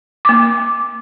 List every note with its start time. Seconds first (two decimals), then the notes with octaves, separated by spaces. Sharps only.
0.25 A#3 D6